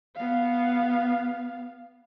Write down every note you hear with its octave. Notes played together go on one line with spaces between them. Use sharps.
B3 F5